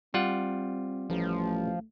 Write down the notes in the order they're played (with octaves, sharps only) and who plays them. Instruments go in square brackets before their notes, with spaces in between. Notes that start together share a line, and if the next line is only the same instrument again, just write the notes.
[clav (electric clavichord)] G3 F4 F#5 [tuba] C4
[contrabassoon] A1 [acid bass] F3 [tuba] A3